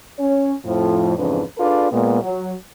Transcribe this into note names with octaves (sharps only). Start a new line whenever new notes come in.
C#4 C#5
F2 A2 F3
F2 G#2 C#3 E3 D4 B4
D4 F4 G#4 A4 B4 D5
A#2 G#3 B3
F#3